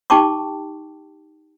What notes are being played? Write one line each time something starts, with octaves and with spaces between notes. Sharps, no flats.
D#4 G4 G5 A5 C#6 D6